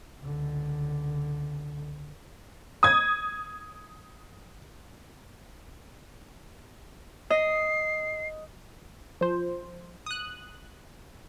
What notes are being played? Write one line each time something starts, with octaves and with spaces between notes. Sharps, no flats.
C#2 D3
D#6 G#6
D#5 C7
F3 C5
D#6 F#6